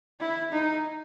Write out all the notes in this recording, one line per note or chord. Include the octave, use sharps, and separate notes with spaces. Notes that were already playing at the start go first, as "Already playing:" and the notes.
E4
D#4